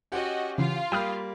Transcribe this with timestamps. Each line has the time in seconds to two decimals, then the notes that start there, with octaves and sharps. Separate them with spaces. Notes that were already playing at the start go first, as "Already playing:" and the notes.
0.12 C#4 F#4 G4 D#5 F#5
0.58 C#3 E3 F4 F5
0.92 G3 A#3 G5 B5 D#6 F6